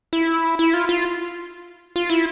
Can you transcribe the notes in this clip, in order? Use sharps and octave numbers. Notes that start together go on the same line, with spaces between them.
E4
E4
F4
F4
F4
E4